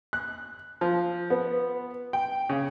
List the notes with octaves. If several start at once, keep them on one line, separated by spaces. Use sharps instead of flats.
F#6
F3
B3
G5
C#3